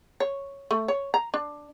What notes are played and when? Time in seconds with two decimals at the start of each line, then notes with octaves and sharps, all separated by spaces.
0.20 C#5
0.71 A3
0.88 C#5
1.14 A#5
1.34 D4